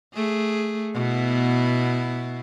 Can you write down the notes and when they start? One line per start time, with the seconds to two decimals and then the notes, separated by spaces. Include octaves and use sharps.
0.14 A3 G#4
0.94 B2 B3 E4